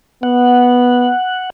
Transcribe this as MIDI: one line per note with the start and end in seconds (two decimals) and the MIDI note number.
0.23 1.11 59
0.23 1.50 78